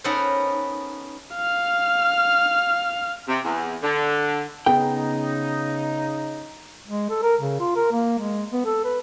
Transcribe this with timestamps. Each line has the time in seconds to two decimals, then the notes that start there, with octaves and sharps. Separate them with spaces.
0.04 B3 C#4 D#4 A4 A#4 C5
1.36 F5 F6
3.28 C3
3.44 E2
3.83 D3
4.66 C#3 B3 D#4 G#4 G5
6.88 G#3
7.10 A4
7.23 A#4
7.41 C#3
7.60 F4
7.76 A#4
7.92 A#3
8.19 G#3
8.52 B3
8.65 A4
8.85 B4